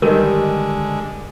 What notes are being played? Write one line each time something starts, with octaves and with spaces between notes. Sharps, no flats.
D3 D#3 G3 G#3 D#4 A#4